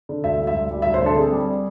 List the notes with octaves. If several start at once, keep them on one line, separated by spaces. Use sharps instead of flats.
D3
D2 E5
G3
E5
D2
G3
E5
D2
C5
D3 A4
C4 G#4
G3